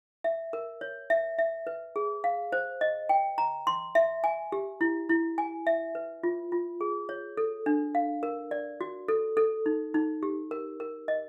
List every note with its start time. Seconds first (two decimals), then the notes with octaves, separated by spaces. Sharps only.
0.24 E5
0.53 A#4
0.81 C#5
1.10 E5
1.39 E5
1.67 B4
1.96 G#4
2.24 F5
2.52 C5
2.81 D#5
3.09 G5
3.38 A#5
3.67 C6
3.95 E5
4.24 G#5
4.52 G4
4.81 E4
5.09 E4
5.38 G#5
5.67 E5
5.95 B4
6.23 F4
6.52 F4
6.81 G#4
7.09 C#5
7.37 A4
7.66 D4
7.95 F5
8.23 A#4
8.51 D5
8.81 F#4
9.08 A4
9.37 A4
9.66 D#4
9.94 D#4
10.23 G4
10.51 A#4
10.80 A#4
11.08 D#5